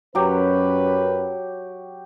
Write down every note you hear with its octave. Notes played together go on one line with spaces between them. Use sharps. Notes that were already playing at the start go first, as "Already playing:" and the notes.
F#2 F#3 G4 B4